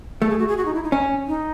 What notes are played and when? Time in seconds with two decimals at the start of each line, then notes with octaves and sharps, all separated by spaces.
0.21 A3 A4
0.30 G#4
0.39 F#4
0.48 G#4
0.57 F#4
0.65 D#4
0.74 E4
0.84 D#4
0.92 C#4
1.28 D#4